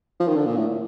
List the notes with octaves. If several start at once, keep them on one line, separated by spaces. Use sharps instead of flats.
F3
D#3
D3
A#2
A2